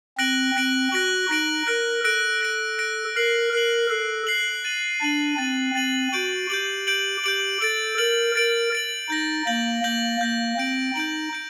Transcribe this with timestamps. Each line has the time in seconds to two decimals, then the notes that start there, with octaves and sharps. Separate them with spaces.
0.18 C4 F#6 A#6 D7 F#7
0.55 C4 F#6 A#6 D7 F#7
0.92 F#4 F#6 A#6 D7 F#7
1.29 D#4 F#6 A#6 D7 F#7
1.67 A#4 F#6 A#6 D7
2.04 A4 F#6 A#6 D7
2.41 F#6 A#6 D7
2.78 F#6 A#6 D7
3.16 A#4 F#6 C7 F#7
3.53 A#4 F#6 C7 F#7
3.90 A4 F#6 C7 F#7
4.27 F#6 C7 F#7
4.64 A6 D#7 F#7
5.01 D4 A6 D#7 F#7
5.38 C4 A6 D#7 F#7
5.75 C4 A6 D#7 F#7
6.13 F#4 G6 D7 F#7
6.50 G4 G6 D7 F#7
6.87 G6 D7 F#7
7.24 G4 G6 D7 F#7
7.61 A4 A6 D7 F#7
7.98 A#4 A6 D7 F#7
8.35 A#4 A6 D7 F#7
8.72 A6 D7 F#7
9.09 D#4 G6 A#6 F#7
9.47 A#3 G6 A#6 F#7
9.84 A#3 G6 A#6 F#7
10.21 A#3 G6 A#6 F#7
10.58 C4 G6 D7 F#7
10.95 D#4 G6 D7 F#7
11.33 G6 D7